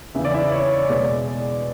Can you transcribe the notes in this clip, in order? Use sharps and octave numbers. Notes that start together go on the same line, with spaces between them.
E2 C#3 E3 E5
D5
E4 E5
C#5
C#5
E2 B2 G#3 D5